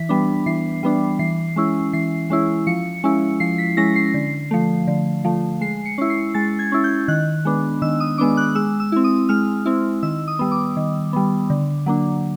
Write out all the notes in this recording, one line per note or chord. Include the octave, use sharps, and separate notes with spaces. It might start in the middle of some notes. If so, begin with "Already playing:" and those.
Already playing: E3 B6
G3 B3 D4
E3 C7
G3 B3 D4
E3 C7
G#3 C#4 E4
E3 C7
G#3 C#4 E4
F3 C#7
G#3 C#4 E4
F3 C7
B6
G#3 C#4 E4 A#6
C7
D3
F3 A3
D3
F3 A3
G#3 C7
C#7
C#4 E4
C7
G#3 A6
G#6
C#4 E4
G6
D#3 F#6
G#3 B3 D4
D#3 E6
D#6
G#3 B3 D4 D6
F#6
G#3 E6
E6
C4 E4
D#6
G#3 F6
C4 E4
D#3 E6
D#6
G3 B3
D6
D#3
G3 B3
D3
F#3 A#3 D4